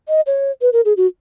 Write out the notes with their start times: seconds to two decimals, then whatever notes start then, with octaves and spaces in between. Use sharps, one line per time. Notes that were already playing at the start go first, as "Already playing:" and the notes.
0.08 D#5
0.27 C#5
0.61 B4
0.73 A#4
0.85 G#4
0.97 F#4